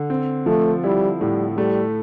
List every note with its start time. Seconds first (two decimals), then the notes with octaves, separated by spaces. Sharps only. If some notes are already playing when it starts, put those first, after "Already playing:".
Already playing: D3
0.10 C4
0.46 F3 A3
0.84 G3 E4
1.20 A2 G3
1.57 G3 A3